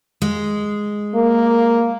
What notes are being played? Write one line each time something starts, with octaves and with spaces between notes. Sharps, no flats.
G#3
A#3